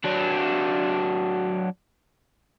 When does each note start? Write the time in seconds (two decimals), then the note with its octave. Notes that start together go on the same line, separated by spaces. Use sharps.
0.04 F#3 D4